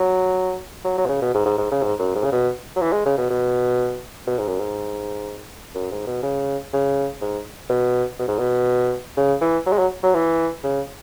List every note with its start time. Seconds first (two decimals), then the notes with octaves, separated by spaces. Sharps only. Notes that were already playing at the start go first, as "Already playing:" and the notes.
Already playing: F#3
0.85 F#3
0.98 F#3
1.05 B2
1.09 C#3
1.22 B2
1.35 G#2
1.46 G#2
1.58 G#2
1.71 C#3
1.82 G#2
1.99 F#2
2.15 G#2
2.24 C#3
2.32 B2
2.76 F#3
2.81 E3
2.93 G#3
3.06 C#3
3.18 B2
3.30 B2
4.27 B2
4.38 G#2
4.48 F#2
4.59 G#2
5.75 F#2
5.91 G#2
6.07 B2
6.23 C#3
6.73 C#3
7.21 G#2
7.70 B2
8.19 B2
8.28 G#2
8.38 B2
9.17 C#3
9.41 E3
9.66 F#3
9.72 G#3
9.79 F#3
10.03 F#3
10.14 E3
10.63 C#3